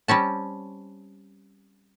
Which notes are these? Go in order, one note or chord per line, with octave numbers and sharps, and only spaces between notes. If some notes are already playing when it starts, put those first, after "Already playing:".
G3 C4 C#4 A5